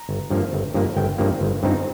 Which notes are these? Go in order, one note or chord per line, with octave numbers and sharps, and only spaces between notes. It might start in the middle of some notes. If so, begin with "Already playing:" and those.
Already playing: A#5
G1
G2 F3 A#3
G1
G2 F3 A#3
G1 G5
G2 F3 A#3
G1
G2 F3 C4 D#4